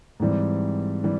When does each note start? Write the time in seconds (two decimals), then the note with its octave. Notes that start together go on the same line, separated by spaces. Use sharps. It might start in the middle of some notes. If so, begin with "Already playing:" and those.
0.20 G#2 E3 G3 C4
1.04 E3 G3